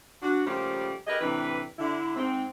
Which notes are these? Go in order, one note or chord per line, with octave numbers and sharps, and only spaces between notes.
D4 F#4
A#2 C#3 F3 G3 A3 G4
G4 G#4 A#4 B4 D#5
A2 C3 E3 G3 D4 B4
D3 E4
G#2 C4